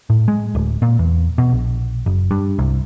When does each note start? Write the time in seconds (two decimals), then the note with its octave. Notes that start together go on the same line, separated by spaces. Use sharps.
0.10 A2
0.28 G#3
0.55 D1
0.82 A#2
0.99 E2
1.38 B2
1.53 A#1
2.06 F#1
2.31 G2
2.59 C2